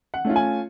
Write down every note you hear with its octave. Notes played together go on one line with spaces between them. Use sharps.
F#5
A3 C#4 F4
G#5